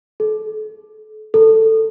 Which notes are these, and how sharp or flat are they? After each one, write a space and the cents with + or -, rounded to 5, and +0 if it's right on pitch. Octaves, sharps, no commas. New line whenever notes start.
A4 -35
A4 +10